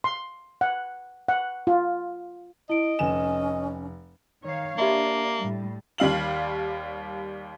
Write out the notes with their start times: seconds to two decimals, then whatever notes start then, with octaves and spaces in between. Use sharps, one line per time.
0.04 C6
0.61 F#5
1.28 F#5
1.67 F4
2.70 E4 D#5 D7
2.99 F1 C#4 G#5 E7
4.44 D#3 C#5 F5
4.78 A#3 D4 G4 E5 B5
5.39 A2 G3
5.98 D#2 G3 F5 F#7